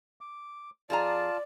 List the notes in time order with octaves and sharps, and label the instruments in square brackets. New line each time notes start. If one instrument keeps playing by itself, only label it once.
[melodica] D6
[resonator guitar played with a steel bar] F2 G#4 A#5 [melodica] F4 A5 [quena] D5